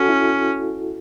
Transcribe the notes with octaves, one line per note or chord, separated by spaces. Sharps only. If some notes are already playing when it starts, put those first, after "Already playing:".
Already playing: C#4 F#4 A4
E4